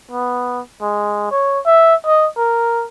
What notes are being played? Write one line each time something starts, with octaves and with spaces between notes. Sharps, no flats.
B3
G#3
C#5
E5
D#5
A#4